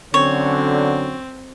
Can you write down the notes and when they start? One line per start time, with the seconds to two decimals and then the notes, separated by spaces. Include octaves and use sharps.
0.14 D3 F#3 C4 C#4 C#5